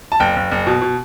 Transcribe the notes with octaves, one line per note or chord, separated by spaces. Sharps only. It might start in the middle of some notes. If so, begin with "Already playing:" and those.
A5
F#1 G5
F#1
F#1
B2
B2